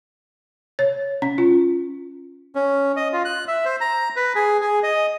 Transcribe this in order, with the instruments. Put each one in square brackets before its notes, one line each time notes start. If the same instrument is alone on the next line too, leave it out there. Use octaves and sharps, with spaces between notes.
[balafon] C#5
C#4
F4
[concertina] C#4
D#5
F4
F#6
E5
C5
A#5
B4
G#4
G#4
D#5